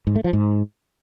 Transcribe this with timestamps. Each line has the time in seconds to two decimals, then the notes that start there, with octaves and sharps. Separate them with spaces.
0.07 G#2
0.16 A3
0.24 F3
0.33 G#2